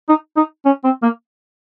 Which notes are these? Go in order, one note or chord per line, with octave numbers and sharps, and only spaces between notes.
D#4
D#4
C#4
C4
A#3